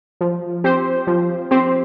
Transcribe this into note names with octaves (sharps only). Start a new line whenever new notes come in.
F3
C4 G4 C5
F3
C4 G4 C5